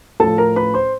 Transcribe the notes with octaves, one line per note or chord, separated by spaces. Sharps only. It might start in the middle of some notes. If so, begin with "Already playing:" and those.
A2 F3 A4 A5
A#4 A#5
B4 B5
C5 C6